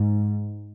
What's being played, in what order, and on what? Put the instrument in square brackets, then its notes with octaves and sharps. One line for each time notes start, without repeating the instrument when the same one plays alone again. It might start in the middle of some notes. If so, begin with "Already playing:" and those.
Already playing: [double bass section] G#2